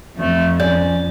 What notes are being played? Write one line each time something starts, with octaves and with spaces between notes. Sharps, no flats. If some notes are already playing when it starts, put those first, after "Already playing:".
F2 A3
C#4 D5 G6